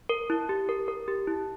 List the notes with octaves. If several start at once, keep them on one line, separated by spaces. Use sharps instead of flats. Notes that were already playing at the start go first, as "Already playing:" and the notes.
A#4
E4
G4
A#4
A#4
G4
E4